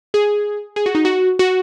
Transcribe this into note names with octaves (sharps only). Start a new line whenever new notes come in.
G#4
G#4
F#4
D#4
F#4
F#4